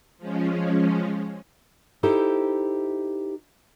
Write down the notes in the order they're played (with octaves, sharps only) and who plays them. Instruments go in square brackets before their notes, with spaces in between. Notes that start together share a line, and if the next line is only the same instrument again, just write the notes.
[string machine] F3 G#3 C#4
[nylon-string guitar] D#4 E4 G4 A4 C5